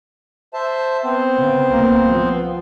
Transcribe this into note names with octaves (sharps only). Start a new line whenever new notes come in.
C5 E5 A5
B3 C4 C5
C#3
C2 A#3
F3